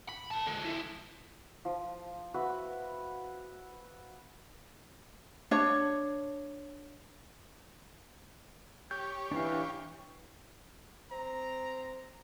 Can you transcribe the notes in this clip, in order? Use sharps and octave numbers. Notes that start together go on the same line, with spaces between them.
B5
A#3 A5
D3 G#3
F3 E4
F3
F#4 B4 E5
D4 C#5
G4 C#5 G6
E3 D4 F5
C4 A#5